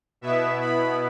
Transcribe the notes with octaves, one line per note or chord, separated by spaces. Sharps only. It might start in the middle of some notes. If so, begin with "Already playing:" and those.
B2 B3 E4 E5
B5